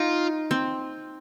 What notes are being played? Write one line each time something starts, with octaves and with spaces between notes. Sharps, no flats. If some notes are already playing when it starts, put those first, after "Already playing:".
Already playing: D#4 F4
C4